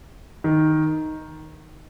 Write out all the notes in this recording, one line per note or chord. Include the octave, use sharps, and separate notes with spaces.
D#3